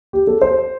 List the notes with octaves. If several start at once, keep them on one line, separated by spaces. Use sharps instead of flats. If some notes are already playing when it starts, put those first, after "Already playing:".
G4
A4
C5